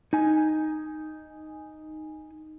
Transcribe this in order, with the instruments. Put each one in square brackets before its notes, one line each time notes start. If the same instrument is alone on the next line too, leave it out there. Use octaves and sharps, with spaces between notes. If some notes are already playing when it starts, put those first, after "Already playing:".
[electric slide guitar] D#4 G#5